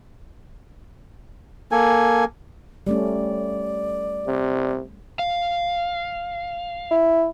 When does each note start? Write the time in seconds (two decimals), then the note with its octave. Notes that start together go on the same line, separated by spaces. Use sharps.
1.72 A#3 A4 G#5
2.87 G3 A3 C#4 D5
4.27 C3
5.19 F5
6.91 E4